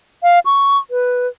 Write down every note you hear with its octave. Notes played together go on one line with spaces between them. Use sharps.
F5
C#6
B4